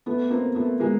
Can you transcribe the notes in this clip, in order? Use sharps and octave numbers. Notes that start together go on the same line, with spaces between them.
A3 B3
A#3 C4
A3 B3
G#3 A#3